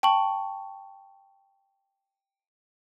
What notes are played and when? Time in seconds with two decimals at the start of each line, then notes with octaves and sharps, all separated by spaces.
0.03 G5 A5 C#6 F#7